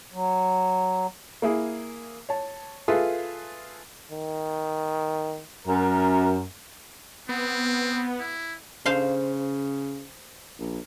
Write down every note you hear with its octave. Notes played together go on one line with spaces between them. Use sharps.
F#3
A#3 E4 G#4
C#5 A5
F4 G#4 A4 B4 E5
D#3
F#2 A#4
B3 C4
E4
C#3 C5 F5 C6
A#1